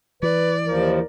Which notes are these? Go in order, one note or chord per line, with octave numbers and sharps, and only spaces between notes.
E3 B4 D5
D#2 F3 A#4